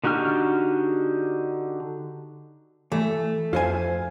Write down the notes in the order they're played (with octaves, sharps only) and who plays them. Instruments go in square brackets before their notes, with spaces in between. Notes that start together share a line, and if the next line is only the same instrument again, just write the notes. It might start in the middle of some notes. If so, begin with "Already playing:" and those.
[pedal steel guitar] D3 D#4 F#4 G4 F6
[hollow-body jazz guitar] E3 [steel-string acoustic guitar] A3
[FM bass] F2 [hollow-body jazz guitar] F4 C5 G#5